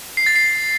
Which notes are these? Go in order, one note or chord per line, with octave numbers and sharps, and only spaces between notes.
C7
A6
C7